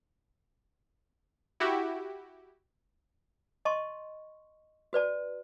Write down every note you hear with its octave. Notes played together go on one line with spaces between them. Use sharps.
E4 F#4 G4
D#5 A5 C6 C#6
F#4 B4 D5 A5